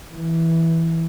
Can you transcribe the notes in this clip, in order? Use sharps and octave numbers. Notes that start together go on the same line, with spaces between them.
E3